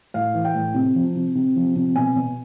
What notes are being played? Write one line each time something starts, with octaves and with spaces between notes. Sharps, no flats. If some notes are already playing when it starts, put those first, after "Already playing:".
A2 F5
E3
G5
A2
C3
F3
C3
C3
F3
C3
B2 G#5
B2